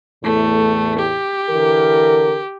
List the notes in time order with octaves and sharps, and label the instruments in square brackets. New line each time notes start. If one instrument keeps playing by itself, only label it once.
[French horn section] E2 A2 [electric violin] A3
[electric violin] G4
[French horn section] D3 E3 A#4